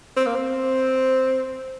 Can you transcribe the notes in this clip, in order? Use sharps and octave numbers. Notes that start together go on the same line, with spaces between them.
C4
A#3
C4